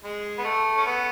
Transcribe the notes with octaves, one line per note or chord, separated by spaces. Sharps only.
G#3
B3
A3
C#4
B3